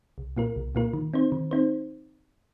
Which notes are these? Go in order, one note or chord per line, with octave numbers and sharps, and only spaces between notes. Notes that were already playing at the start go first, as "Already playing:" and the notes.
C2
A#2 A#3 F4 A#4
C2
A#2 A#3 F4 A#4
D#3
C4 D#4 C5
D#3
C4 D#4 C5